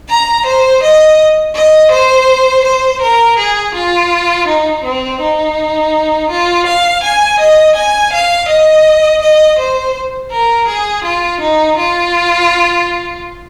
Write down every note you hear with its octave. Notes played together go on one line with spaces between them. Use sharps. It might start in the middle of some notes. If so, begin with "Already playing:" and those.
A#5
C5
D#5
D#5
C5
C5
A#4
G#4
F4
D#4
C4
D#4
F4
F5
G#5
D#5
G#5
F5
D#5
D#5
C5
A#4
G#4
F4
D#4
F4